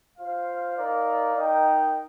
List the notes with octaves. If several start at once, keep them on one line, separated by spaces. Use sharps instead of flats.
F4 C5 F5
D#4 A#4 D5 F5
D#4 A#4 D#5 G5